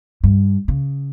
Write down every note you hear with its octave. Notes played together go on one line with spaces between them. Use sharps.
G2
C#3